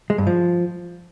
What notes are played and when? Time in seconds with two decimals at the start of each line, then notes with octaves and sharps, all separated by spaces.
0.10 G#3
0.18 G2
0.27 F3